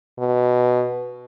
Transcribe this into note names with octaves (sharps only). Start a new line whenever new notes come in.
B2